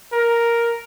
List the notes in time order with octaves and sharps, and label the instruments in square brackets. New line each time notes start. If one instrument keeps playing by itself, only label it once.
[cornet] A#4